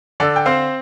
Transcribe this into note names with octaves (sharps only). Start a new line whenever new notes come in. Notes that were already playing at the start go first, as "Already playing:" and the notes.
D3 A4 D5
G5
C4 C5 F5